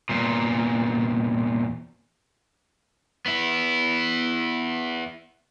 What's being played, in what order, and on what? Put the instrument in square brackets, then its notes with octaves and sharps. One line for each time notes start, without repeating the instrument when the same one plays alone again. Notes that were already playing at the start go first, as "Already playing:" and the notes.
[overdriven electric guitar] E2 A#2
B3 E4